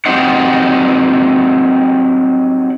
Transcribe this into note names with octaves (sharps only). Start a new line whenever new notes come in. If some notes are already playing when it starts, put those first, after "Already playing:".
F#3 C4 D#4 G4 F5 F#5